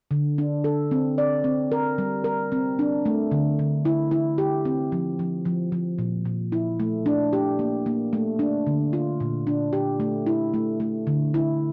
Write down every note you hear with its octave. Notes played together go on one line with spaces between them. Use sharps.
D3
D4
A4
C4
D5
C4
A#4
G3
A#4
C4
D4
A3
D3
D3
E4
E4
G4
C4
F3
F3
F3
F3
A#2
A#2
E4
A3
D4
G4
A#3
A#3
A3
D4
D3
F4
A#2
D4
G4
A3
E4
A3
A3
D3
E4